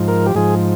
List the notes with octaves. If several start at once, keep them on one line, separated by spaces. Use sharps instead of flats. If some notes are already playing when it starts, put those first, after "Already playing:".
Already playing: G#2 F3
A#4
G4
G#2 F3 G#4